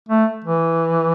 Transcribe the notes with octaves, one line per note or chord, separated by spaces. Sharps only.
A3
E3